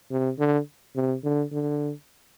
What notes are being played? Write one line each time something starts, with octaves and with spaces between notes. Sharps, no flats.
C3
D3
C3
D3
D3